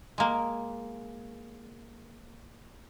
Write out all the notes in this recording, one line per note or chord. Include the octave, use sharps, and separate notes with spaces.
G#3 A#3